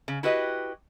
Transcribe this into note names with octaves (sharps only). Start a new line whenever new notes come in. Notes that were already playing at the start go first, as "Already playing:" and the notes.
C#3
E4 F#4 G4 B4 D#5